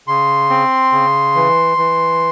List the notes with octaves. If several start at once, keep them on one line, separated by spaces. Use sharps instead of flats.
C#3 C6
C4
C#3
E3
E3